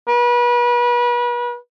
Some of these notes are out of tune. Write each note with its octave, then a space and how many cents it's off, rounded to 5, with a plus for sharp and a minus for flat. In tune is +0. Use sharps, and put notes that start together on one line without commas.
B4 -35